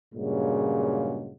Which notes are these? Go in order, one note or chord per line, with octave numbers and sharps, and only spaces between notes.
G2 A#2 C#3 F#3 G#3